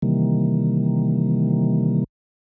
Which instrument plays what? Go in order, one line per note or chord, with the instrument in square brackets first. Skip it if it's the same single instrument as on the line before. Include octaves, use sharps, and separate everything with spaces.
[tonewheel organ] C3 D#3 E3 G3 A#3